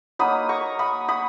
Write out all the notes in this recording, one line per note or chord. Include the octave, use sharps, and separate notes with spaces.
F#3 A#3 D#4 B5 D#6
A#5 C#6
B5 D#6
B5 D#6